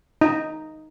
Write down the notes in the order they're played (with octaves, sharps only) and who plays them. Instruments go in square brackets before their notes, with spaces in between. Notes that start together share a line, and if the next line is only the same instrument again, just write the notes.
[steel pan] D#4